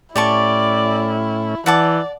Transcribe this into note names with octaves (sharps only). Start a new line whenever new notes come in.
A2 A3 C#4 E4 G4 D5 A5 C#6
E3 D5 F#5 A5 D6